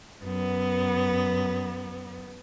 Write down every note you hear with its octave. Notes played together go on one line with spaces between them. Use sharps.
F#2 B3